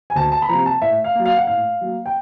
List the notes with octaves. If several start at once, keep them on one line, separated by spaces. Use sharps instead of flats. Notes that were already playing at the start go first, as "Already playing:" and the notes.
G#5
D2 A5
A5
B5
C3 F3 A#5
A5
A2 E5
F5
F#3 A#3
F5
F#5
A2 F5
F#3 A#3
G5